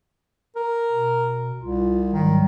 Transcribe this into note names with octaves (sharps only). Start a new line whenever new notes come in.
A#4
B2
C2 F4
G#2 D#3 F#3 G3